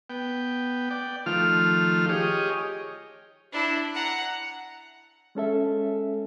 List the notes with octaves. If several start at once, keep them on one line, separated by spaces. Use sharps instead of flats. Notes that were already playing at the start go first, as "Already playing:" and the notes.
B3 G5
D5 G5
D#3 F3 A3 F4 F6
G4 G#4 C#5 D#5
D4 E4
F#5 A#5
G#3 C#4 A4 E5